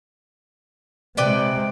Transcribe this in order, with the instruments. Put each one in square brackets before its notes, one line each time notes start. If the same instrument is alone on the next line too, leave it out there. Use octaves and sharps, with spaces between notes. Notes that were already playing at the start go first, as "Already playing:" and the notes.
[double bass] C3 G#3 [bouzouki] B4 D5 G5